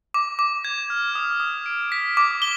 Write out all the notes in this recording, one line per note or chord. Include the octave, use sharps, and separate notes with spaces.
D6
D6
G#6
F6
D#6
D#6
D7
B6
D6
G7